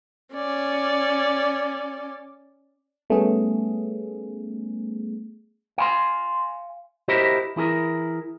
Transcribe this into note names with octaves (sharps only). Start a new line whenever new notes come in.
C#4 D5
G3 A3 B3 C#4 G#4
F5 G#5 B5 C6
E4 F#4 G4 A#4 C5 D#5
E3 E4 G#4 A#4